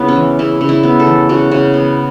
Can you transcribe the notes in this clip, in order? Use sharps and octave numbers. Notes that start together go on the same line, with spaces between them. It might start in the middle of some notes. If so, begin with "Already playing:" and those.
Already playing: C#3 B3 E4
C#4
E3
C#3 E4
C#3
E4
B3
A4
E3
C#3 F#4
C#3
B3